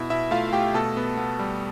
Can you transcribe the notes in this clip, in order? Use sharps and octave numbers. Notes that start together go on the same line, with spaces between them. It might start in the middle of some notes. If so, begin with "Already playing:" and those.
Already playing: B2 E4 E5
B2 E4 E5
A3 F4 F5
A3 G4 G5
B2 A4 A5
B3
B3
G3